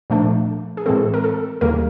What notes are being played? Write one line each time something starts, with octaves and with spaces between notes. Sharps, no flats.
A#2 F3 A3 D4
G#4
A2 E3 G#3 C4 A4
A#4
A4
D#2 C#3 E3 G3 A#3 A#4